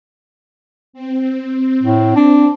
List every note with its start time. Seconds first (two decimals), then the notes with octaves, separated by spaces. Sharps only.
0.93 C4
1.83 A2
2.16 D4